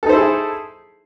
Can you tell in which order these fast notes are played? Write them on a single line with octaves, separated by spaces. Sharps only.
A4 D#4 C5 E4 G#4